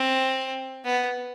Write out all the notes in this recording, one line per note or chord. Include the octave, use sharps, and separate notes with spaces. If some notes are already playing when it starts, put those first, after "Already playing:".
Already playing: C4
B3